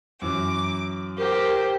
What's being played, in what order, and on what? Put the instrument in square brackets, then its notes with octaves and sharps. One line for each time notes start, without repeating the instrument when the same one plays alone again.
[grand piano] F#2 E3 F#3 [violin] D6
[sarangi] G4 [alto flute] A#4 [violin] C5